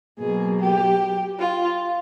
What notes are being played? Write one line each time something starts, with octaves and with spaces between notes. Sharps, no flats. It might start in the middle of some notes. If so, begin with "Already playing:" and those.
B2 F#3 A#3 G#4
G4
F4